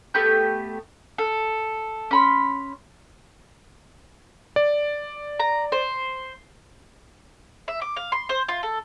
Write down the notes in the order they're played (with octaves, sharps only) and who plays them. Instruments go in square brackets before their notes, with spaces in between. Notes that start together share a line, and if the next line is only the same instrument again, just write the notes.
[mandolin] A3 B3 G4 G6
A4
C#4 B5 C6
[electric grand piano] D5
[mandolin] A#5
C5
E5
D6
F5
C6
C5
F4
A4